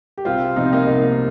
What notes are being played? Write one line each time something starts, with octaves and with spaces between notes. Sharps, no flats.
G4
C2 C4 F4
C3 F3 D#4
C4
A#3 D#4
C2 A#3